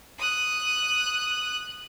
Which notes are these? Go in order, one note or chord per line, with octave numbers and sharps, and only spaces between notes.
D#6 F#6